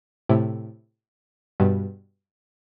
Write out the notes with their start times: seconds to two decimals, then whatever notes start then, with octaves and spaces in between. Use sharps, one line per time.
0.29 A2 C3
1.60 G2 B2